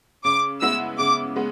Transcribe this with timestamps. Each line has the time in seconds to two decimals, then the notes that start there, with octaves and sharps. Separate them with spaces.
0.24 C#3 D6
0.61 G#3 B3 E4 E6
0.99 C#3 D6
1.36 G#3 B3